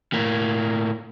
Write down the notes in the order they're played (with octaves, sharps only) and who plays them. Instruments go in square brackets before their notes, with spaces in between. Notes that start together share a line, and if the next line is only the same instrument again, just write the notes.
[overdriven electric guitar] A2 A#3